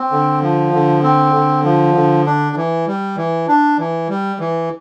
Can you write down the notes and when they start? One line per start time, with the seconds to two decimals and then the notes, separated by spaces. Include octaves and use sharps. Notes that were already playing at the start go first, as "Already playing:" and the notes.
Already playing: C4
0.11 D3
0.42 F3
0.73 D3
1.03 C4
1.34 D3
1.64 F3
1.95 D3
2.26 D4
2.56 E3
2.87 G3
3.17 E3
3.48 D4
3.79 E3
4.09 G3
4.40 E3